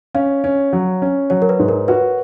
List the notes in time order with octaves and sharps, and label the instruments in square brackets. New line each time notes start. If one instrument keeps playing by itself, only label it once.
[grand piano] C#4 [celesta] F5
[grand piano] C#4
F#3
C#4
[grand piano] F#3 [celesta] C#5
[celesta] A#4
B4
[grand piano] G#2
[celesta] A#4
[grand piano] F#4 [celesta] B4